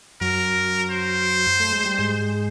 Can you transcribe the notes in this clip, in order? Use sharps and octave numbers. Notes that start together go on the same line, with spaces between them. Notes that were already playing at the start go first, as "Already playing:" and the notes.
F#2 F#3 A#4
C5
A3
G#3
G3
G#2 G#3